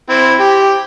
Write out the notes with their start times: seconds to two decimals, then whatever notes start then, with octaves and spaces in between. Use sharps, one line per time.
0.09 C4 E4
0.40 G4